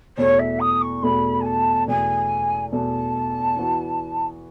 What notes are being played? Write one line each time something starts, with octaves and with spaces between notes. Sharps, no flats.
E2 B2 A3 C#5
E5
D#6
C#6
E2 B2 A3 B5
G#5
A5
E2 B2 A3 G#5
E2 B2 A3 A5
E3 B3 F#4